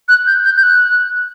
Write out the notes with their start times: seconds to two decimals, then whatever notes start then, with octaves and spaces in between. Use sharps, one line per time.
0.09 F#6
0.27 G6
0.45 G6
0.57 G6
0.63 F#6